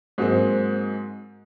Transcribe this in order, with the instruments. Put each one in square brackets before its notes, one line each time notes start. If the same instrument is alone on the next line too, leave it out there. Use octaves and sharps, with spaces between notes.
[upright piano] G#2 F#3 G#3 A#3 C4